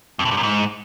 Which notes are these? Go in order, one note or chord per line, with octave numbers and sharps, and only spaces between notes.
F2
A2
G2
F#2
G#2